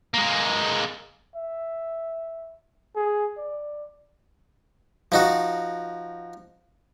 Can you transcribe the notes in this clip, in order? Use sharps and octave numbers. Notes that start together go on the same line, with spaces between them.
G#3 A#3
E5
G#4
D5
F3 D#4 F#4